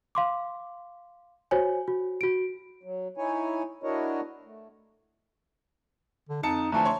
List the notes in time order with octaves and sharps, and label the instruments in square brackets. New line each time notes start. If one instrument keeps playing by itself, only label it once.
[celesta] F5 C6 D6
F#4 C5 C#5 G#5
F#4
F#4 D7
[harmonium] F#3
D#4 E4 C#5 G#5
D4 E4 F#4 A#4 C#5 D#5
A3
[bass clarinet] D3
[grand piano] F2 A5 C#7 [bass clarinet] D#4
[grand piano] D3 E3 F3 [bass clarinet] A3 [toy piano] A5 A#5
[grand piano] C#5 C6 C#6